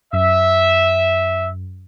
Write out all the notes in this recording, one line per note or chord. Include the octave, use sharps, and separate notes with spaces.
F#2 E5